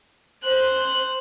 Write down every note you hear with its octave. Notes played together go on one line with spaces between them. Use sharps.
C5 F#6